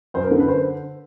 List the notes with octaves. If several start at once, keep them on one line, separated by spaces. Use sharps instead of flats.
F#2 C5
A#4
D3 A4
B4
C5